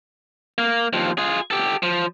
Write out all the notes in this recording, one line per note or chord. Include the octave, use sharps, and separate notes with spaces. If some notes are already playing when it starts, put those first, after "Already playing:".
A#3
D#2 F3
F4 G#4
G4 A4
F3